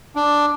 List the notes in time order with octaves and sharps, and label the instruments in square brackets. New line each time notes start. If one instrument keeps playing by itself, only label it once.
[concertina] D4